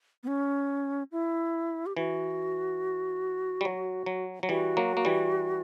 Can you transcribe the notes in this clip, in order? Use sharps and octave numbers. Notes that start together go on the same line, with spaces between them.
B3
C#4
E4
G4
E3 F#4
G3
F#3
F#3
F#3
E3 G3 F#4
F#3 A#3
A#3
E3 G3